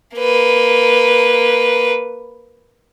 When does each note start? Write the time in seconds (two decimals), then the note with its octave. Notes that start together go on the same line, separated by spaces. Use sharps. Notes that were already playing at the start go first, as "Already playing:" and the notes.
0.16 A#3 B4